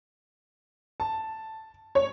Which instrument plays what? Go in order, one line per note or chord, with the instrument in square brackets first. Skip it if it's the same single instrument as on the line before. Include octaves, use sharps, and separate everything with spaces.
[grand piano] A5
[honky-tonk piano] C#5